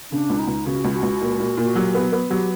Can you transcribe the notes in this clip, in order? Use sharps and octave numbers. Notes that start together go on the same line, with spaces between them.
C#3 D4
C#2
D#4
C#2
C#3 F#4
C#2
F#4
C#2
A#2
A#2
A#2
F#4
F#3 G4
B3
B3
F#3 G4